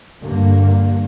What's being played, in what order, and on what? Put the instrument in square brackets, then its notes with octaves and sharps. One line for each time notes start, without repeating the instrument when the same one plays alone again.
[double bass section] G2 D3 A#3